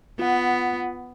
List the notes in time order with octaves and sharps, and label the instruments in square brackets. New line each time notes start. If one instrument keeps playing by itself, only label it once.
[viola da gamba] B3 [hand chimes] F4 F#5